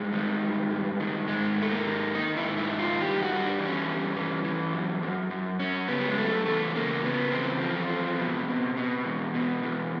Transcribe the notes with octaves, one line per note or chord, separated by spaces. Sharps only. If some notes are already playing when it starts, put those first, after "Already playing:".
Already playing: G2 G#3
D#3
G2
G2
D#3
G#2 G#3
G#2
A3
A#3
D#3
D#3 D#4
E4
G#2
E4
D#3
F4
G2 G4
F#4
G2
D4
E3
C#4
G2
E3
E3
F#2
F#2
F#2
F#2 C#4
C#3 B3
G3
G#3
F#2 A3
E2 A3
C#3 A#3
C#3 B3
E2 C4
F3
E2
B2
B2
B2
E2
B2
E2